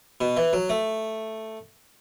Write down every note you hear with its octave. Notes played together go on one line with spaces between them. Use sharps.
B2
E3
F#3
A3